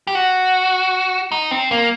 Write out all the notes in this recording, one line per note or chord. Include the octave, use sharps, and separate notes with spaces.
G4
F#4
D#4
C4
A#3